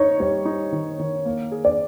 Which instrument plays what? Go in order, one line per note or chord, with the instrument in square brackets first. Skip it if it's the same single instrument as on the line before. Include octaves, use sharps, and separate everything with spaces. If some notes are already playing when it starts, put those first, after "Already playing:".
Already playing: [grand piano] D#4 [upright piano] C#5
[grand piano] G3 [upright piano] C#5
[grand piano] D#4
D#3
D#3
A#3
G#4
[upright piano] D5